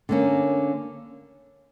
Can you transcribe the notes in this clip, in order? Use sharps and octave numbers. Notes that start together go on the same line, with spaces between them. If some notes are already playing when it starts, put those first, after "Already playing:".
D3 A#3 C#4